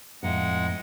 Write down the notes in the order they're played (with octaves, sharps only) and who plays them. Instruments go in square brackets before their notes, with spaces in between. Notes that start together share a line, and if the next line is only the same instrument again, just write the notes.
[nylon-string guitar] F2 A2 [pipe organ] G#3 F#5